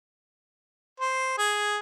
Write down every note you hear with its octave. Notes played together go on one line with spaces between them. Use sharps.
C5
G#4